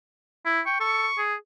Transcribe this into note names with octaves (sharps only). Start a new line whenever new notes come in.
E4
G5 C#6
A4 C#6
G#4